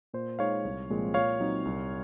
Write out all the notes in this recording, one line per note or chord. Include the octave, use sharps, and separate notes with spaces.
A#2 C5
G#3 D#4 C#5 F5
C2
A#2 F3 G#3 C4
A#2 C#5 F5
F#3 C4 D#4
C2